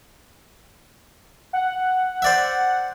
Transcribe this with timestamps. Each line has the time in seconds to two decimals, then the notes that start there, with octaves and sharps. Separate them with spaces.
1.53 F#5
2.22 C5 D5 E5